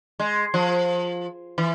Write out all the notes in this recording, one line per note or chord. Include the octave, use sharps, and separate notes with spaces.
G#3
F3
E3